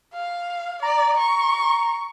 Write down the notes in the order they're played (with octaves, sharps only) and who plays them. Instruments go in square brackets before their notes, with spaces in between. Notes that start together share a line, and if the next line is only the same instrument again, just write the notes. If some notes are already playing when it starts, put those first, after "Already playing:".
[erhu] F5
[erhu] D5 [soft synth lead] A#5
[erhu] C#6